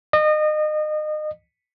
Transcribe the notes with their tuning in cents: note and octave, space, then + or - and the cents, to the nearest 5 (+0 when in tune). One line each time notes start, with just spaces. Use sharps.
D#5 -30